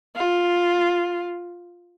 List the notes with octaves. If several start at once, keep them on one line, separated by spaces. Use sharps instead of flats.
F4